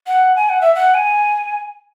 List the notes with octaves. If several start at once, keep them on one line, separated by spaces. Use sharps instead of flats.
F#5
G#5
F#5
E5
F#5
G#5